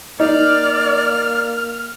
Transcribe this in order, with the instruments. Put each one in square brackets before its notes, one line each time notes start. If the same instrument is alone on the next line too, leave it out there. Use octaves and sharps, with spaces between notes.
[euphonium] A#3 [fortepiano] D#4 [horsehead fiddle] D5 [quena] F6